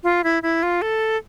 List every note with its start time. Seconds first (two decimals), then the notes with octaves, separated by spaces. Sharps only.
0.04 F4
0.24 E4
0.43 E4
0.63 F4
0.82 A4